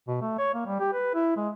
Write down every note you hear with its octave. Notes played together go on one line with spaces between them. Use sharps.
B2
A3
C#5
A#3
G3
G4
B4
E4
G#3